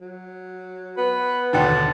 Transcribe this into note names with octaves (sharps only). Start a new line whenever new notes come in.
F#3
B3 B4
D#2 B2 D3 D#4 G5 A5